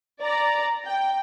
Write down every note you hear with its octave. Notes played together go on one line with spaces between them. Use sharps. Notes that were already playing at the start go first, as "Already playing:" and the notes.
D5 A#5
G5